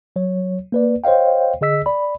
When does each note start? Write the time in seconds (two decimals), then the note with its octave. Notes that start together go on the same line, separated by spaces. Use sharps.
0.16 F#3 C#5
0.72 A#3 B4 D5
1.04 C5 C#5 D#5 F5 G5
1.61 D3 G#4 D#5 E6 B6
1.86 D5 B5